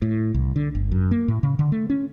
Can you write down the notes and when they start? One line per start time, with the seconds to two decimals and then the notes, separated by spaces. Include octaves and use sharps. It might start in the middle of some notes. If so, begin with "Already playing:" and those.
0.02 A2
0.34 C2
0.56 D3
0.75 G1
0.92 F#2
1.11 A#3
1.28 A2
1.43 C#3
1.59 D3
1.72 A3
1.90 C#4